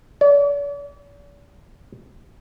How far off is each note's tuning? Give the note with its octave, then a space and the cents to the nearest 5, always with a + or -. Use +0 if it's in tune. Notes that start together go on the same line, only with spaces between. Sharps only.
D5 -45